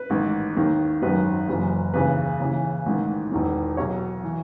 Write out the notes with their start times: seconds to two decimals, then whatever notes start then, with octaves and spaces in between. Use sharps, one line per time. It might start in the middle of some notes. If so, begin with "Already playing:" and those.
Already playing: B4
0.10 A1 G#2 D#3
0.57 D#2 D#3
1.02 G#1 F#2 D#3 B4
1.48 F#1 F#2 E3
1.93 D#2 C#3 E3 B4
2.40 D#2 C#3 E3
2.86 A1 G#2 D#3
3.32 E1 E2 D#3
3.77 B1 B2 C#5
4.24 E3